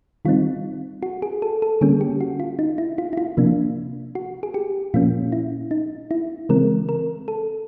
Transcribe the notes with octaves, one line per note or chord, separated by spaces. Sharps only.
D#3 G3 C4 D#4 F4
F#4
G#4
A4
A4
D3 G3 A#3 C#4 G#4
G4
F#4
F4
D#4
E4
F4
E4
F4
C3 F3 A#3 D4
F#4
G#4
G4
A#2 F3 A#3 C#4 F4
E4
D#4
E4
C#3 E3 G#3 C4 A#4
A#4
A4